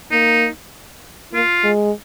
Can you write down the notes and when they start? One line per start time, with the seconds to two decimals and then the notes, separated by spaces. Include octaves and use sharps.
0.11 A#3 D#4
1.33 A#3 F4
1.64 G#3